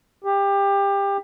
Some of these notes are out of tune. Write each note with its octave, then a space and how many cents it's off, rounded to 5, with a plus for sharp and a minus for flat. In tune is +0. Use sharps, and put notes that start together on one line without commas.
G4 +25